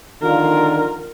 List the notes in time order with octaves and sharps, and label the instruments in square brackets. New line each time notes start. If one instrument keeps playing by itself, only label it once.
[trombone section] D3 D#3 F4 [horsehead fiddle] A#4